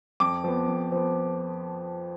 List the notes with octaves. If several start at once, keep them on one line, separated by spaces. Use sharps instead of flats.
F2 D6
F3 B3
F2
F3 B3